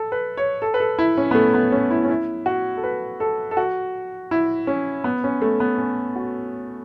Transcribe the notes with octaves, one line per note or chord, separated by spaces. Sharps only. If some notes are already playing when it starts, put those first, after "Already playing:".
Already playing: A4
B4
C#5
A4
B4
A4
E4
C#4
B3
A3
B3
C#4
E4
C#4
E4
F#4
A4
B4
A4
A4
F#4
E4
C#4
B3
C#4
A3
B3
C#4
F#4